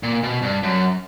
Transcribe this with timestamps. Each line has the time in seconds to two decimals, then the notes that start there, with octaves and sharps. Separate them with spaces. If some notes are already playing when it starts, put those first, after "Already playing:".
0.03 A#2
0.23 B2
0.42 G2
0.63 F#2